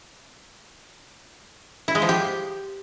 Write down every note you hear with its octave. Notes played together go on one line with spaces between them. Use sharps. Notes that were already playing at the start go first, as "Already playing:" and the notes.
E4
G#3
F3
G4